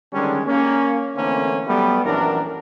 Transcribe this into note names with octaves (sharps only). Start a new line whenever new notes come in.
D3 D#3 G3 G#3 C#4 D4
A#3 C#4
D3 E3 A3 A#3 C4 C#4
F#3 G3 A3 B3
A#1 F#2 E3 D4 A#4